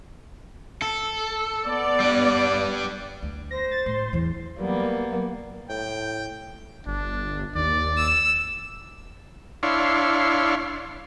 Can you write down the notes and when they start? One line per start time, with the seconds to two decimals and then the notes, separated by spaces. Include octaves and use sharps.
0.82 A4
1.65 B3 D5
2.00 G3 B4
3.23 D2
3.51 C5 A#6
3.71 A6
3.86 A2 C6
4.13 E2 E3
4.56 F#3 G3 A#3 B3
5.69 A2 G5
6.87 G1 D4
7.55 D#2 D5
7.98 E6
9.63 D4 E4 C#5 F5 C6